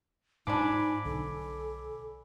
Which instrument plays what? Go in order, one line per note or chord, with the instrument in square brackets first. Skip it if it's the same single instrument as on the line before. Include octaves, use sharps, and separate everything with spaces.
[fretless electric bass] G#2 G#3 [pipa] F3 D4 [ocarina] D#4 [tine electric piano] G#5 B5 D6
[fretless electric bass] B1 D3 [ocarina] A4